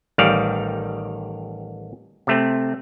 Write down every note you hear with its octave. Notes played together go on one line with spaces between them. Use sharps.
A1 D#3 G3 D5 F5
C3 A3 C4